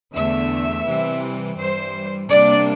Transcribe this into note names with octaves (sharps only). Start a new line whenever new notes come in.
E2 D3 A3 E5
C3 E3 G3 C4
G2 E3 G3 C5
C3 G3 A#3 D4 D5